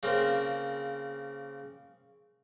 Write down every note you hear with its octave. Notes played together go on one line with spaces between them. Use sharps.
C#3 A#3 C4